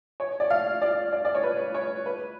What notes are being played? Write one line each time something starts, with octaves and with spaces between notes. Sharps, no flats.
C#5
D5
F5
D5
D5
D5
C#5
B4
C#5
B4